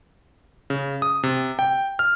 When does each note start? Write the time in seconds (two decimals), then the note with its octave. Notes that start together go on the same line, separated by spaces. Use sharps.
0.70 C#3
1.02 D#6
1.23 C3
1.59 G5
1.99 F6